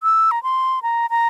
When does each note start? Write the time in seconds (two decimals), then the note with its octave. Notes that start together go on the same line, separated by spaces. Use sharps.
0.03 E6
0.31 A#5
0.43 C6
0.83 A#5
1.10 A#5